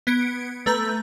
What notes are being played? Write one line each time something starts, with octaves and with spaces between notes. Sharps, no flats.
B3 G#6 C#7 D7
A3 B4 A#5 G6